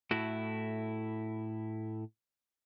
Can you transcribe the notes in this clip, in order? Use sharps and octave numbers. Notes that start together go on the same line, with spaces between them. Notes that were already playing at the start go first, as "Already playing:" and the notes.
A2 A3 E4 F#4